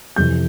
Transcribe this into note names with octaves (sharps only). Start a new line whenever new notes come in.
F2 C3 E3 G6